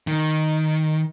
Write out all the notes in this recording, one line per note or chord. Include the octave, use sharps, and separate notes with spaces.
D#3